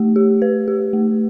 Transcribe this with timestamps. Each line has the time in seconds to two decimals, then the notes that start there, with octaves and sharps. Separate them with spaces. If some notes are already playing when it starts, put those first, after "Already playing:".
Already playing: A3 G4
0.16 G4
0.42 B4
0.68 G4
0.93 A3